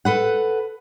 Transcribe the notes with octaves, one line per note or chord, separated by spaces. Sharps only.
A4 B4 F#5